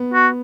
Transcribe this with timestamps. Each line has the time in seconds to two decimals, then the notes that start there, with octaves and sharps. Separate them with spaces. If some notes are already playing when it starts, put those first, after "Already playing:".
Already playing: B3
0.14 F#4